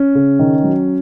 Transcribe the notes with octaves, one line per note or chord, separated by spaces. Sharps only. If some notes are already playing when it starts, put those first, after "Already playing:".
Already playing: C#4
C#3
D#3
F#3